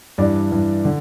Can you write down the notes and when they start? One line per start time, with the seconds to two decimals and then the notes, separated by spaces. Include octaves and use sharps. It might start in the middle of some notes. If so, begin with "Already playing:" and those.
0.18 G2 E3 D4 D5
0.51 G2 E3
0.85 D3